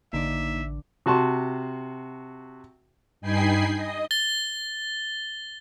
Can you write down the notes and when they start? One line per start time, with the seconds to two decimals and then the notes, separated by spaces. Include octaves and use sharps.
0.13 A1 D3 A#3 D#4 D5 E5
1.06 C3 F#4 A5 C6
3.21 G2 D#4 G5 G#5 B5 C7
3.74 D#5
4.11 A6 G7